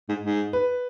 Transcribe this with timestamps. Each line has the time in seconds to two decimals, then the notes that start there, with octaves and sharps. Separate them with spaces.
0.09 G#2
0.24 G#2
0.53 B4